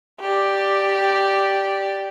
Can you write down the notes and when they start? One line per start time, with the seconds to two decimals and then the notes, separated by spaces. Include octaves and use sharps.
0.21 G4 D5